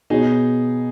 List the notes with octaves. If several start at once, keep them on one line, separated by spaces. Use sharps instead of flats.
B2 B3 D#4 F#4 G#4 C#5